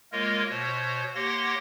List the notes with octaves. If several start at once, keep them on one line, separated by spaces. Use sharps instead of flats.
G#3 A#3 F4 A#4 C#5 D#5
B2 C5 C#5
A#3 G4 C#5 F#5 C6 A#6